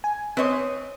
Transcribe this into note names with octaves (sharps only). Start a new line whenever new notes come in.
G#5
C4 B4 C#5 D#5